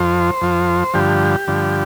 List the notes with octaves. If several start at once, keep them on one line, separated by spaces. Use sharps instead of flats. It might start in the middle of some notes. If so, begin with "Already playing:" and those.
Already playing: F2 F3 C5
F2 F3
G2 D3 F3 G4
G2 D3 F3